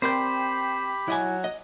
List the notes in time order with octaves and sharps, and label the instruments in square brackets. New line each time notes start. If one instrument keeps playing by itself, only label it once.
[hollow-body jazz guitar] C4 A#4 D5 [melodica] G4 B5 [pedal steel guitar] C5 G5
[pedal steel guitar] F#3 [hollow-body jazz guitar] E4 D#5 G#5
[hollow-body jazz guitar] D#5